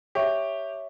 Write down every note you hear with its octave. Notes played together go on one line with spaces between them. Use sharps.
G4 C#5 E5 C#6